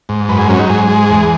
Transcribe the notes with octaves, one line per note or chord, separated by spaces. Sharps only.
G#2
F#2 B4
G#4
F#3 C#4
D#4
G#2 G#4
G#3
E2